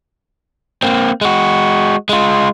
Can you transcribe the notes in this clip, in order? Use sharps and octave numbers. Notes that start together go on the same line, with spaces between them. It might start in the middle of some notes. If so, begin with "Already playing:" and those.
A#3 C4
G#3 F#4
G#3 F4